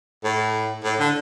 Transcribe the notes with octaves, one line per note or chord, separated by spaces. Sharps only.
A2
A2
D3